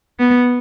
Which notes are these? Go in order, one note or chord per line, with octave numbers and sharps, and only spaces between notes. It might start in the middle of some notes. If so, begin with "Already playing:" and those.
B3